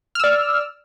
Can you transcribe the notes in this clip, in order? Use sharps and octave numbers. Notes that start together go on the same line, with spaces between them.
D5 E6 F6